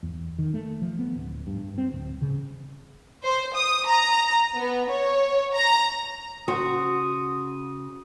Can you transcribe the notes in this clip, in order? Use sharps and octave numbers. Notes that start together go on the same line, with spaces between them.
E2
D#3
A3
F3
B3
D1
G2
C4
D1
C#3
C5
D#6
A#5
B3
C#5
A#5
C#3 F#4 C5 D#6